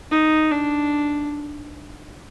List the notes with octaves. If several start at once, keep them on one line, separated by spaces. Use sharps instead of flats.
D#4
D4